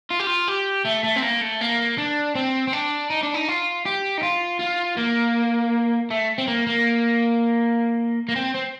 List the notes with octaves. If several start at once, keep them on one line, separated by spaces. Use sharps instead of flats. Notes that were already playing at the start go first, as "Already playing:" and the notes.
F4
G4
F4
G4
A3
A3
C4
A#3
A3
A#3
D4
C4
C4
D4
D#4
D4
D#4
F4
G4
D#4
F4
F4
A#3
A3
C4
A#3
A#3
A#3
C4
C4